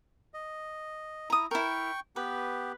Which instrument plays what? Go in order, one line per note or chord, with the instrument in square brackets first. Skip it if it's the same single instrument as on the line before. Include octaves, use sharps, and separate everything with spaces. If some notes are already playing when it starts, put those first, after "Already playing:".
[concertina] D#5
[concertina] E4 [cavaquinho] A#5 D#6
[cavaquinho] E4 A#4 [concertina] G5 C#6
[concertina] B3 G4 [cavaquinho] B4